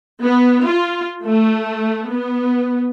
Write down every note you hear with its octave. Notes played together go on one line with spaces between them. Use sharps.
B3
F4
A3
B3